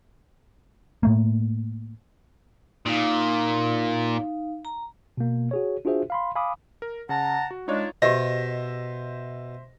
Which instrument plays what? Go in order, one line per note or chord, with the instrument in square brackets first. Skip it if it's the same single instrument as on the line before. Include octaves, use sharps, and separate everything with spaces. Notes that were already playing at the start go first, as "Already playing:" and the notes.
[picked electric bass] A2 A3 A#3
[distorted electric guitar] A#2 [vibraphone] D#4 F5
[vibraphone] A#5
[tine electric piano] B2 A#3
F#4 G#4 C#5
D4 F4 F#4 G#4 C5 E5
F5 B5 C6
F5 G#5 B5 D6 D#6
[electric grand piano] A#4
[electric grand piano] C#3 [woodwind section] F#5 A5 A#5
[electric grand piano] F#4
[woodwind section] G#3 D4 [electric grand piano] D#4 F4 C#5
[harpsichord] B2 [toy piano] G4 D#5 [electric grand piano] C5 E5 A#6